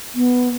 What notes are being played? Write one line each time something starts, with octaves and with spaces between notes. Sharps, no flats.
B3